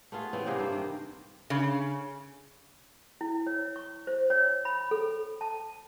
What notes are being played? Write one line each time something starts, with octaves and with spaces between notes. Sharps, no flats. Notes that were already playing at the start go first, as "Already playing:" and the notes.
A3 B3 F4 G#4
C#3 E3 B3 C4
C3 A#3 D#4 G#4
G2 C5
D#3
C#3
E4
C#5
C#6
C5
C#5
B5
A4
A5